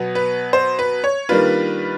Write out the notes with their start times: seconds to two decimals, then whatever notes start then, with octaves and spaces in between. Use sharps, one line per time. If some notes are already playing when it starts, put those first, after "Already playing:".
Already playing: B2 F#3 B3
0.15 B4
0.53 C5
0.79 B4
1.04 C#5
1.29 D#3 G3 A#3 D4 F4 B4